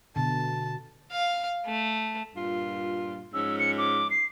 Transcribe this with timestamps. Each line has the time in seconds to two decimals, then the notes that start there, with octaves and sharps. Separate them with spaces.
0.16 B2 D3 A5
1.11 F5
1.66 A3
2.35 G2 A#2 F4
3.34 G#2 F3 C#4 E6
3.59 C#7
3.78 D6
4.10 C7